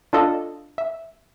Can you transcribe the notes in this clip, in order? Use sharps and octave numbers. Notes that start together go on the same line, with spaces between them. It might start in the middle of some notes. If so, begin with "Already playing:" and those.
D4 F4 A4 D#5
E5